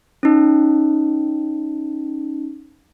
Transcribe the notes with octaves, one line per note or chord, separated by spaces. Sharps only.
C#4 D#4